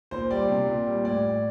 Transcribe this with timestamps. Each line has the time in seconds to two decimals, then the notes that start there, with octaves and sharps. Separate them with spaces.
0.11 A#2 C5
0.30 G3 D5
0.49 C3
0.67 A#2
0.86 G3
1.04 A2 D5
1.23 A2